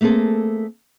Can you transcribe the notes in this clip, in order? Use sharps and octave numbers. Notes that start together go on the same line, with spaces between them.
A3 A#3 C4 G#4 A4